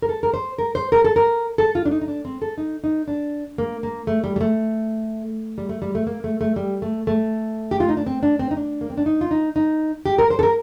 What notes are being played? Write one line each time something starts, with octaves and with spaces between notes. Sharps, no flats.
A#4
A4
A#4
C5
A#4
C5
A#4
A4
A#4
A4
F4
D4
D#4
D#4
D4
C4
A4
D#4
D#4
D4
A#3
A#3
A3
G3
G3
A3
G3
A3
G3
A3
A#3
A3
A3
G3
A3
A3
G4
F4
D#4
D4
C4
D4
C4
D#4
D4
A#3
C4
D4
D#4
F4
D#4
D#4
G4
A#4
C5
A4
A#4